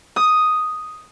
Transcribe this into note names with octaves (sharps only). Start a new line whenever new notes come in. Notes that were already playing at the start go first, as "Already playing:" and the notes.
D#6